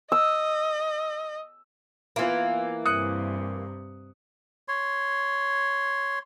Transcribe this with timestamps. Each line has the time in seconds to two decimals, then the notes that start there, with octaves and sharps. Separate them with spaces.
0.12 D#5 E6
2.16 E3 A#3 B3 F4 E5
2.86 G2 C3 D#6 F#6 C#7
4.68 C#5 C6